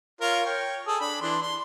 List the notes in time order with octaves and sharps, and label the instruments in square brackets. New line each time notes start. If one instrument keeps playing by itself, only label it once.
[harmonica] F4 A#4 C#5
C#5 G5
G#4 A4
D4 B5
E3 D4 C6
C6